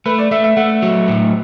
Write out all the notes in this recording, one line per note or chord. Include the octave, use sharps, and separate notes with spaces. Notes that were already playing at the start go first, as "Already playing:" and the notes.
A3 B4
D5
A3 E5
E5
A3 F#5
F#3
A2